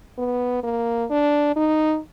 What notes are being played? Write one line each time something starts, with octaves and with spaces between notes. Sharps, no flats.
B3
A#3
D4
D#4